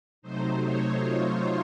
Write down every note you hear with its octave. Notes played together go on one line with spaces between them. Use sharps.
C3 F#3 A3 D#4 C5
C#5
F4